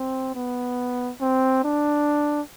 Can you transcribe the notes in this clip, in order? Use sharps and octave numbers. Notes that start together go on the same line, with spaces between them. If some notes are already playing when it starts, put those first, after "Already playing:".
Already playing: C4
B3
C4
D4